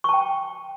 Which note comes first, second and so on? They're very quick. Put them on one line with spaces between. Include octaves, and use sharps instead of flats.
C#6 A5 G5